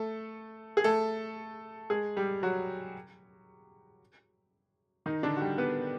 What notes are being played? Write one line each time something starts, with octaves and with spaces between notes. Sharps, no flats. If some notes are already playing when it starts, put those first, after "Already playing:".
Already playing: A3 A4
G#4
A3 A4
G#3 G#4
G3 G4
F#3 F#4
D#3 D#4
D3 D4
F#4
G3 G4
B3 B4